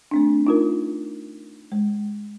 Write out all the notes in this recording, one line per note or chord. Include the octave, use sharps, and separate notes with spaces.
A3 C4 D4
D#4 F4 A#4
G#3